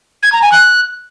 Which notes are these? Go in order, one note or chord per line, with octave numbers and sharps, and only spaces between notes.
G#6
A#5
G#5
F#6